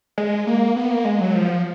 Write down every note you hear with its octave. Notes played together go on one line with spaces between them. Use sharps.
G#3
A#3
B3
A#3
G#3
F#3
F3